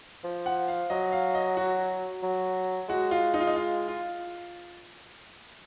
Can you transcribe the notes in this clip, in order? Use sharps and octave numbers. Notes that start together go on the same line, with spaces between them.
F3
F#5
F5
F#3 D#5
F5
D#5
F#4
F#3
G#3 F#4
F4
D#4
F4
D#4
F4
F4